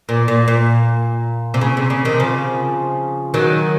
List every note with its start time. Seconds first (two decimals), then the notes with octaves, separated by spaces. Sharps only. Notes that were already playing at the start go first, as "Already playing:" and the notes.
0.09 A#2
0.28 A#2
0.48 A#2
1.54 C3
1.61 C#3
1.77 C3
1.90 C#3
2.05 C3 D#3
2.20 C#3 F3
3.34 D#3 F#3